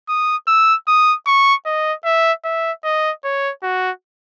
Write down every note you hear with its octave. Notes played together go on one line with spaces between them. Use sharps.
D#6
E6
D#6
C#6
D#5
E5
E5
D#5
C#5
F#4